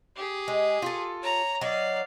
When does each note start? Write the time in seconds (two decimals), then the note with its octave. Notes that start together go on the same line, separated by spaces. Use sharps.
0.16 G4 G#4
0.48 G#3
0.82 F4 A4
1.22 C#5 A#5
1.61 F#3 D#4 D5 F5